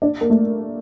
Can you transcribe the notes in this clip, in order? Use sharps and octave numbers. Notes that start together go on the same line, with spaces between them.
D4
A#3
A3